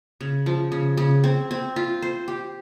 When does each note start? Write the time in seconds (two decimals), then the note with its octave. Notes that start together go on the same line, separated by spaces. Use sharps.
0.21 C#3
0.46 F3
0.72 C#3
0.97 C#3
1.24 C4
1.51 C4
1.76 F4
2.02 C5
2.28 G4